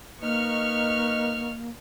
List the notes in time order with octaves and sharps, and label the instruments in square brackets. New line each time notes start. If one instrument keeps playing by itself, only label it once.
[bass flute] A#3 [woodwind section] D#4 B4 D#5 [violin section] C#6 F6